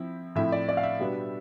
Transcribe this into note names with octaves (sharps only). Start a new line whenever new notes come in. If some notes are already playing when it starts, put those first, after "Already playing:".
Already playing: F3 C4 E4
A2 F3 C4 E4 E5
D5
D5
F5
E5
B2 G3 B3 D4